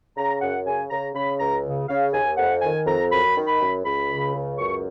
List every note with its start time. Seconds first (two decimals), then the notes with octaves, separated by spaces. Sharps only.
0.17 C#3 A#5
0.41 F#2 F#5
0.66 C#3 G#5
0.90 C#3 A#5
1.15 C#3 B5
1.39 C#2 A#5
1.65 C#3
1.88 C#3 F5
2.13 D#2 G#5
2.37 F2 F#5
2.61 D#3 G#5
2.86 F2 A#5
3.11 F#2 B5
3.36 D#3
3.47 B5
3.60 F#2
3.84 C#2 B5
4.10 C#3
4.34 C#2
4.58 F#2 C#6